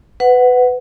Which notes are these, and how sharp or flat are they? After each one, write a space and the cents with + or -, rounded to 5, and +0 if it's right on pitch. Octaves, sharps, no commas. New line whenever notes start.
B4 +20 F#5 +0